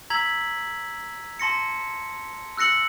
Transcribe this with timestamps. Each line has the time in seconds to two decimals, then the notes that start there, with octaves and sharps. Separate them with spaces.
0.10 A#5 E6 G#6 B6 F#7
1.39 A5 C6 A#6 C#7
2.57 E6 F#6 A#6 C#7 F#7